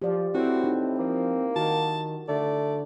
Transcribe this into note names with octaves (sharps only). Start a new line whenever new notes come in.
F3 G4 D5
A2 C4 E4 F#4
D#4
F3 A#3
D#3 F#4 A5
D3 A3 D5